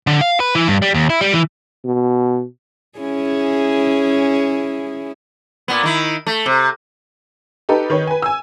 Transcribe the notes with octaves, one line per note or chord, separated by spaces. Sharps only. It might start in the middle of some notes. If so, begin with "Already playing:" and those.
D3
F5
B4
E3
G2
G3
D#2
E4
G3
E3
B2
C#4 E4 G#4
A#2 B3
D#3 E4
A3
C3
D#4 G4 A4 B4
D#3 B4 C#5
B4 G#5
G#5 E6